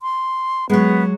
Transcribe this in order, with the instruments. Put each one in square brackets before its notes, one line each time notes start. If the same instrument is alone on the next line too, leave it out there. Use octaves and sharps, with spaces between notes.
[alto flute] C6
[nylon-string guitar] F#3 G#3 [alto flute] B3